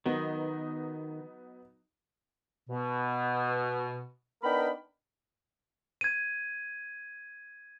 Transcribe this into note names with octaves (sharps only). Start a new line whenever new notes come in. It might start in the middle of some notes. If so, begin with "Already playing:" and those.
D#3 F#3 B3 D#4
B2
B3 D4 D#4 A#4 G5 B5
G#6 D#7